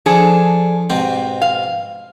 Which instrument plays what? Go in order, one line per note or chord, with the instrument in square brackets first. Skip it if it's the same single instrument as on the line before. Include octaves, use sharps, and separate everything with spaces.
[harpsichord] F3 [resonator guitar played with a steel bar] D4 G#4 A4
[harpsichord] G#2 B2 G4 [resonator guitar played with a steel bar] C4
[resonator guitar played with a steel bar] F5